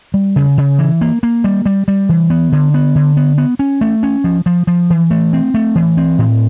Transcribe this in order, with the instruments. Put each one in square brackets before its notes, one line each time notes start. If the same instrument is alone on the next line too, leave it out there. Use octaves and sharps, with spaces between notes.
[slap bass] G3
C#3
C#3
E3
A#3
A#3
G3
G3
G3
E3
B3
D3
B3
D3
B3
B3
C#4
A3
C#4
F3
F3
F3
E3
A3
C4
A3
E3
C4
A2